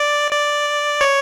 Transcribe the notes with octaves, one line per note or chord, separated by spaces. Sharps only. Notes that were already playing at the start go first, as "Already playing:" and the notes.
Already playing: D5
D5
C#5